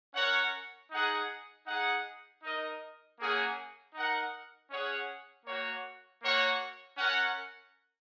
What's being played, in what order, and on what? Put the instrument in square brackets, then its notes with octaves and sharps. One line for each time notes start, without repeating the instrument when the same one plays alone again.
[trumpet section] C#4 A#4 C#5 F#5
D#4 G#4 F#5
D#4 G#4 F#5
D#4 A#4 D#5
A#3 C#4 G#4 F#5
D#4 A#4 F#5
C#4 G#4 C#5 F#5
A#3 F#4 C#5 F#5
A#3 F#4 C#5 F#5
C#4 A#4 F#5